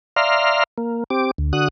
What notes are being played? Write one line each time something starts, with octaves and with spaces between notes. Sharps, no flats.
D5 E5 F5 A#5 C6 F6
A#3
C4 G4 D6
D2
D3 F#4 D#6 F#6